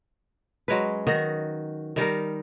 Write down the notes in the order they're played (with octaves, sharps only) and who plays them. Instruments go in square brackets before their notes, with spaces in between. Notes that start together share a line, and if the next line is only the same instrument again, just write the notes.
[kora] F#3 G#3 C#4 B4
D#3 F#4 D#5
D#3 G3 D#4 A#4